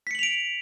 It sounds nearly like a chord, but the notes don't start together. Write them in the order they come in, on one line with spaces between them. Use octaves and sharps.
B6 C#7 F#7 F7 D7